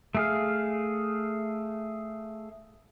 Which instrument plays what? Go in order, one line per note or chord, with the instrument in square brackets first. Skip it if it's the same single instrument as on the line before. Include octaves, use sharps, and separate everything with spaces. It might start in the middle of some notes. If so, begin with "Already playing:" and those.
[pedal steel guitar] A3 G#4 F5